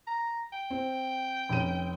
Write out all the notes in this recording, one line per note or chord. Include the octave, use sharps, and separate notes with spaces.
A#5
G5
C4
F1 C#4 D#7